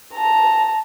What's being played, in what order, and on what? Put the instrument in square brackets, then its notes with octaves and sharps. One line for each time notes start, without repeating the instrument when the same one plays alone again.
[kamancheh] A5 A#5